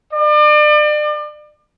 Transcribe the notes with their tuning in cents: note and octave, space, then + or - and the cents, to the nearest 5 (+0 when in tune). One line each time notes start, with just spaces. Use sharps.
D5 +35